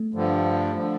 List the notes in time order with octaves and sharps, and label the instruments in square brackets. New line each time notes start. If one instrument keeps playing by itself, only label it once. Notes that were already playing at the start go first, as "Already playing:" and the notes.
Already playing: [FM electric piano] A3
[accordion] G2 D3 F3
D3 F3